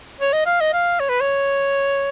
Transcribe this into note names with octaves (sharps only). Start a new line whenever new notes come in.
C#5
D#5
F5
D#5
F5
C#5
B4
C#5